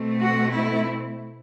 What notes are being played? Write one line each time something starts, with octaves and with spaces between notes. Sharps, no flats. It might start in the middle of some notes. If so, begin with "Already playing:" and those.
Already playing: B2 A3 C4
F#4
E4